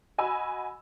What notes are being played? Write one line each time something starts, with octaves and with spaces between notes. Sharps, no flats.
F#4 D#5 G#5 B5 E6